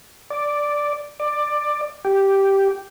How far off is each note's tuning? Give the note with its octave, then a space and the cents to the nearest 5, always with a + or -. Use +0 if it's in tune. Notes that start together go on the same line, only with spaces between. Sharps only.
D5 +0
D5 +15
G4 -5